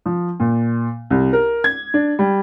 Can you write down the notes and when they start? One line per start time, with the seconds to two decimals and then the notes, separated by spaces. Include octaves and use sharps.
0.06 F3
0.40 A#2
1.10 C2
1.33 A#4
1.64 G#6
1.94 D4
2.19 G3